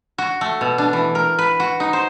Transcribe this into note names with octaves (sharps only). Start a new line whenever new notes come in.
F#4
A3
B2
D4
E3
A#4
B4
F#4
D#4
C5